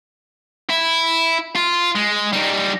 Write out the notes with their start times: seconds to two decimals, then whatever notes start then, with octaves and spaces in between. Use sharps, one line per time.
0.70 E4
1.55 F4
1.95 G#3
2.33 G3 D#4